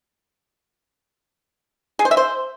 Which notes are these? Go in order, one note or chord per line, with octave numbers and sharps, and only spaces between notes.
G#4
C5
E5
C5